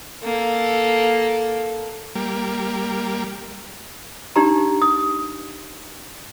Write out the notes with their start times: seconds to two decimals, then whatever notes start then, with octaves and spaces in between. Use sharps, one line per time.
0.23 A#3 A4
2.15 G3 A#3
4.36 D4 D#4 G4 A#5
4.82 D#6